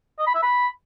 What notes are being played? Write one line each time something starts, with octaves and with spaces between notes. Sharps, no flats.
D#5
B5
E5
B5